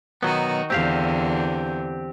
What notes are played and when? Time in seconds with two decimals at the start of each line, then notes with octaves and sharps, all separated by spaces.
0.23 B2 D#3 F#3 B3 D#4 F#4
0.70 E2 D3 C4 G4 F5